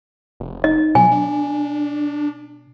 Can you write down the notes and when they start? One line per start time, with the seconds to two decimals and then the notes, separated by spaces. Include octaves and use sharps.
0.40 F1
0.64 D#4 D#5
0.95 B2 F#3 G#5
1.12 D4